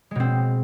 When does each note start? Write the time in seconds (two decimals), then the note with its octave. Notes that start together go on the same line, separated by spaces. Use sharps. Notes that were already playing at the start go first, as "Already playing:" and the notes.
0.11 G#3
0.15 B2
0.20 C4